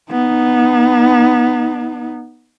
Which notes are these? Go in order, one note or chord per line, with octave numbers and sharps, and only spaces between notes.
B3 D#4